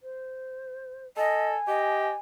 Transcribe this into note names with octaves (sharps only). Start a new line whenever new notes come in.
C5
A4 D#5 G#5
G4 D#5